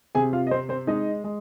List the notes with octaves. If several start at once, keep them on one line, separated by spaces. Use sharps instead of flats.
C3 G#4 G#5
F4 F5
D#5
C4 C5
C4 C5
G#3 D#4 D#5
G#3